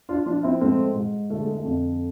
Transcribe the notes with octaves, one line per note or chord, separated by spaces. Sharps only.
D4 F4
F3 D4 F4
C4 E4
G#2 A3 C4
G#2
D3 A3
G#3
A3
F2